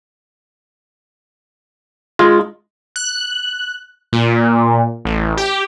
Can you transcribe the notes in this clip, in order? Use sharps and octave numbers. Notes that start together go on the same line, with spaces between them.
G#3 F4
F#6
A#2
A1
G4